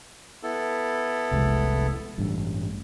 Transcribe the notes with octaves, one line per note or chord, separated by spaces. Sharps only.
B3 E4 A4
F1 C2 G#3
A1 G2